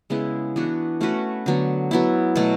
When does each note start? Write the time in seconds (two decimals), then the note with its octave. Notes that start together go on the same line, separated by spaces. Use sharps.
0.10 C#3 G#3 B3 E4
0.56 E3 B3 D4 F#4
1.01 A3 C#4 F#4 B4
1.46 D3 F#3 B3
1.91 F#3 B3 E4
2.36 B2 F#3 A3